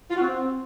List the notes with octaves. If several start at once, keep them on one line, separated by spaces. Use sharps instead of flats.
F4
F#4
C4